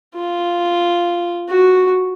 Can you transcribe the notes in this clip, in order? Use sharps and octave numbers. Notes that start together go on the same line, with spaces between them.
F4
F#4